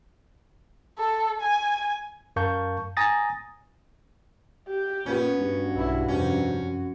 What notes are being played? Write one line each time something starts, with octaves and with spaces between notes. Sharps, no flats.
A4
G#5
F#2 A#4 F5 A5 C#6 G6
G#5 A#5 D#6 A6 A#6
G4
A#2 B3 C#4
G2 F#4
B1 E4
F2 C3 C#4
F#2